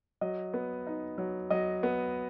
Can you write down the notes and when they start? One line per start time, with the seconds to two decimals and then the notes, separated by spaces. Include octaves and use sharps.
0.21 F#3 D#5
0.54 B3
0.87 D#4
1.18 F#3
1.50 F#3 D#5
1.83 B3